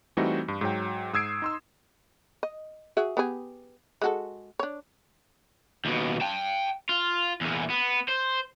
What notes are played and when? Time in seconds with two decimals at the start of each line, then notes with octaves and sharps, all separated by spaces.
0.17 E3 G3 A3 C4 D#4 F#4
0.48 G2
0.61 G#2 F#3 G5
1.13 G#2 D#6 E6 G#6 C7 D7
1.42 D#4 C6 E6
2.43 D#5
2.97 F#4 G#4 E5
3.17 B3 G4 G#4
4.02 G#3 F#4 A4
4.59 D4 C#5
5.85 D#2 B2
6.21 G5 A5
6.89 F4
7.41 E2 A#2
7.70 B3
8.08 C5